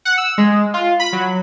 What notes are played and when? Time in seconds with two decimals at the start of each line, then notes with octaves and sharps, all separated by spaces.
0.05 F#5
0.18 E6
0.38 G#3
0.74 F4
1.00 B5
1.13 F#3